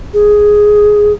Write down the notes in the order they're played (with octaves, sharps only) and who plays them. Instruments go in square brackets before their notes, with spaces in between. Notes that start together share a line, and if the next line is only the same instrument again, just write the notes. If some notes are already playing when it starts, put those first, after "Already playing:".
[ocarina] G#4